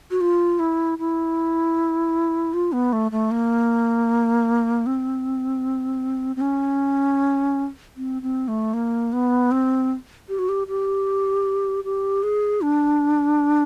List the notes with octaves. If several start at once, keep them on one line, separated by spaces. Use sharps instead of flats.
F#4
F4
E4
E4
F4
B3
A3
A3
A#3
C4
C4
C#4
C4
C4
A3
A#3
B3
C4
G4
F#4
G4
G4
G4
G#4
D4